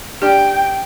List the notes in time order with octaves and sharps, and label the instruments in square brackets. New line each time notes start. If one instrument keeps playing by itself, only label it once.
[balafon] D4 G4 D5 [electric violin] G5